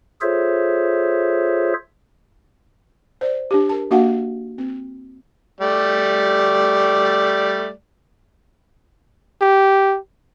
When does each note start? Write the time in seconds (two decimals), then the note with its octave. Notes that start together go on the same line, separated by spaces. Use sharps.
0.21 F4 G#4 A4 C5 C#5 E5
3.21 C5 D5
3.51 D4 G4
3.69 A#4 A5
3.91 A#3 D4 F#4 F5 F#5
4.58 C4
5.61 G3 A3 D5
9.42 G4